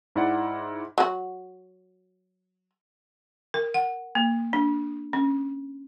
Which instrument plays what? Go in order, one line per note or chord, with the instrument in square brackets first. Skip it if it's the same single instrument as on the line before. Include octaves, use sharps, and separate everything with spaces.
[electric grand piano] G#2 E4 D5 F#5
[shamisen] F#3 F#4
[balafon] A#4
F#5
A#3
D4
C#4